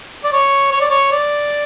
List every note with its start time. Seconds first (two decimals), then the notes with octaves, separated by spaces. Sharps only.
0.24 D5
0.32 C#5
0.72 C#5
0.81 D5
0.90 C#5
1.12 D5